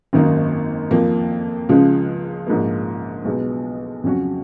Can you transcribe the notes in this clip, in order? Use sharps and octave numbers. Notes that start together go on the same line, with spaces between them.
G#1 F#2 D#3 A#3 D#4
F2 F3 A#3
C#2 C#3 F3 G#3
A#1 G#2 F3 A#3
B1 B2 G#3 B3
F2 C#3 F#3 C#4 F#4